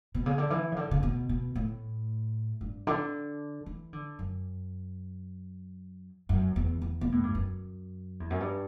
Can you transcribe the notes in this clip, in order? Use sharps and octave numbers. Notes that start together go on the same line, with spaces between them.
B2
C#3
D3
E3
C#3
D3
C#3
B2
B2
A2
G2
D3
E3
D3
F#2
F#2
E2
E2
B2
A2
G2
F#2
E2
F#2
G2